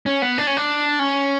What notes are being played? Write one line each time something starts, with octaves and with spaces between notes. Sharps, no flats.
C#4
B3
D4
C#4
D4
C#4